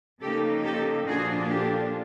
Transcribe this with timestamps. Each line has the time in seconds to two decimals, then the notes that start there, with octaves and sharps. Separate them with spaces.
0.21 C#3 F3 A#3 D#4 G4 A4
0.64 G4 A4
1.07 A#2 F3 A#3 D4 F4 F#4 G#4
1.50 G4 A4